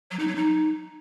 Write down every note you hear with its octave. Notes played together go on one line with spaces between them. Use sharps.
F#3
D#4
F#3
D#4